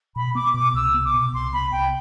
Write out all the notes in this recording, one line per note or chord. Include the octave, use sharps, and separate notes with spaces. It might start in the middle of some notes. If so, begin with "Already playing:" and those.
B2 B5
B3 D6
B2 D6
C2 E6
B3
D6
B2
C2 C6
B3 B5
C2 G5